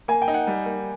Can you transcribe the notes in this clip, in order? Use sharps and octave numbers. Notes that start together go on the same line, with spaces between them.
A#3 G#5
G5
D#4
F#5
G3
A#3